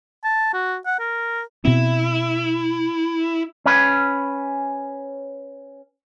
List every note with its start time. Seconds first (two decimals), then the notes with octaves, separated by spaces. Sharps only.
0.24 A5
0.53 F#4
0.86 F#5
0.99 A#4
1.65 B2 B3 C4 E4
3.66 C#4 B4